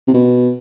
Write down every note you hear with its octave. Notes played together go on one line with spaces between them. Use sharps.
C3
B2